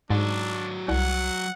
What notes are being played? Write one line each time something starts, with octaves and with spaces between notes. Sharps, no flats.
G#2 F#3 D4 D5
C2 F#5